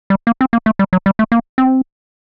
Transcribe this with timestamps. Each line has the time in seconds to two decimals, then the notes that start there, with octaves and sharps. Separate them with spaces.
0.10 G3
0.27 A#3
0.41 C4
0.53 A#3
0.66 A3
0.79 G3
0.93 F#3
1.06 G3
1.19 A3
1.32 A#3
1.58 C4